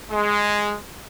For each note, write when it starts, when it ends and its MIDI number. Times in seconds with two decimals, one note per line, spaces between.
0.11 0.76 56